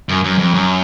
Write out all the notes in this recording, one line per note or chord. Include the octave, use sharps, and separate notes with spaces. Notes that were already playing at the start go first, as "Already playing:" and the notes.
F#2
F#2
F2
F#2